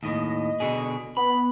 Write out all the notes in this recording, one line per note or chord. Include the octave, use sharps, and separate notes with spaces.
D#2 A2 D#5
B2 D3 G#4
B3 B5